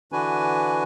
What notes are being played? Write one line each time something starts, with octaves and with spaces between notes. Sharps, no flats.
D3 E3 D4 F#4 B4 G#5